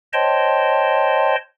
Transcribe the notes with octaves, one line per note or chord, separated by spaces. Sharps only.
C5 C#5 D#5 G5 A5 C6